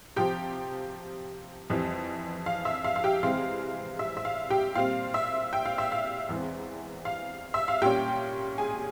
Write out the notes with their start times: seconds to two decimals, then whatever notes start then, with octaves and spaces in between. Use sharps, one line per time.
0.16 C3 F3 C4 G4 G5
1.70 F2 E3 G3 C4
2.46 F5
2.65 E5
2.84 F5
2.96 F5
3.04 G4 G5
3.23 C3 E3 G#3 C4 F5
3.99 E5
4.17 E5
4.25 F5
4.50 G4 G5
4.75 A#2 G3 C4 F5
5.14 E5
5.53 G5
5.65 F5
5.78 E5
5.92 F5
6.29 E2 E3 G#3 C4
7.05 F5
7.54 E5
7.68 F5
7.82 A#2 G3 C#4 G4 G5
8.58 G#4 G#5